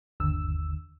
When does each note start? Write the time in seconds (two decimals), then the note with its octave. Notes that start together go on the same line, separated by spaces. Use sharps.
0.20 G1 D#2 D3 E6